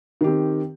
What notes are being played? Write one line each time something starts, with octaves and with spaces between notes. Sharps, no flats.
D#3 C4 G4